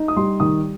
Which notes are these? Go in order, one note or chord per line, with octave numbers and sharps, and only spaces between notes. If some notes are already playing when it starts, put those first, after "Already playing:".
Already playing: D#4
D#6
G3 C6
D#3 D#6